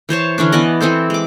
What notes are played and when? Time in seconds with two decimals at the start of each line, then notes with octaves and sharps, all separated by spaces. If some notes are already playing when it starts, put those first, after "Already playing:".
0.09 E3 C5 C#5 A5
0.38 D3 E3 C#4 D4
0.52 E3 B3 D5 D#5
0.81 E3 C4 A4 C5
1.10 G#3 D6